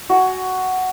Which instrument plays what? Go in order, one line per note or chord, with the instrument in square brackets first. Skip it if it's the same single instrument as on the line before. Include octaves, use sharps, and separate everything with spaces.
[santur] F#4 F#5 G#5